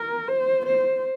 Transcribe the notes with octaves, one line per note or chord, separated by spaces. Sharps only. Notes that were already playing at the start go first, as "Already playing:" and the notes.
Already playing: A#4
C5
C5